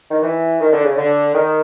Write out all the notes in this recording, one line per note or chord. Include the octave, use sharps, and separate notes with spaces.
D#3
E3
D#3
D3
C#3
D3
D#3